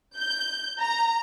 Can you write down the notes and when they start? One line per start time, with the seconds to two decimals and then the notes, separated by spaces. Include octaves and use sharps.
0.17 G6
0.81 A#5